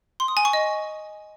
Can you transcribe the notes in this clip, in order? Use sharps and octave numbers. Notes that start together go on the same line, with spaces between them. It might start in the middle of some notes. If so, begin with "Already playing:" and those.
C6
D#6
G#5
C#6
D#5